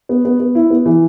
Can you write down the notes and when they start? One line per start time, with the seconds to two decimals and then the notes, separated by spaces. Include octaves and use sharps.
0.09 B3
0.25 B3
0.40 B3
0.55 E4
0.70 B3
0.86 E3